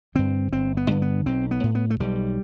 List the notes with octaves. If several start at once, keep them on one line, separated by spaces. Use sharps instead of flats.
G2 D3 C4
G1 C4
B3
G2 D3
B3
B1 C4
B3
A2
B3
A3
B1 G3